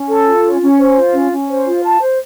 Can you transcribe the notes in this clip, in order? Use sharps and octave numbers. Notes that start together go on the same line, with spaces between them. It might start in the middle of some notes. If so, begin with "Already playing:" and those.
Already playing: C#4
A4
F4
C#4
C#4
C5
F4
C#4
C#4
C5
F4
A5
C5